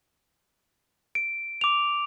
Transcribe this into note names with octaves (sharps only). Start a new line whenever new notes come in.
D7
D6 F7